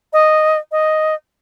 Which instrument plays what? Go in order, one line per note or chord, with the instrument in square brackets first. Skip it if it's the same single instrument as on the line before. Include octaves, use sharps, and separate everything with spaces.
[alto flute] D#5
D#5